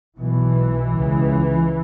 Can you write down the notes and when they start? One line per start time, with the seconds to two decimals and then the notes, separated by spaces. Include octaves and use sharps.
0.18 B1 B2 E3
0.93 C#2 C#3